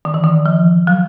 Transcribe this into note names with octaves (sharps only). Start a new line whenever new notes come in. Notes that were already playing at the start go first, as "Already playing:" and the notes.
D#3
E3
D#3
F3
F#3